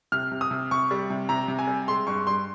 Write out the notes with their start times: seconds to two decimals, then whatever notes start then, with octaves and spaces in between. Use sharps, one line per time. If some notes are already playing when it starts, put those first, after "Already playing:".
0.12 C3 F6
0.31 C3
0.41 D#6
0.51 C3
0.71 C3 C#6
0.91 G3
1.10 C3
1.29 C3 A#5
1.48 C3
1.59 G#5
1.67 G3
1.88 G#3 C6
2.07 G2 C#6
2.27 G2 C6